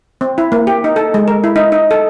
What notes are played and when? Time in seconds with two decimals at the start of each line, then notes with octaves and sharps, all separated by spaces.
0.21 C4
0.38 E4
0.52 A#3
0.67 G4
0.84 D#4
0.96 A4
1.14 G#3
1.28 A#4
1.44 E4
1.56 D#4
1.72 D#4
1.91 A4